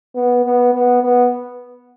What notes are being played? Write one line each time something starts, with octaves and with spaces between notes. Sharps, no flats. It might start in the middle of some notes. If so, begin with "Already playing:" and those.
B3
B3
B3
B3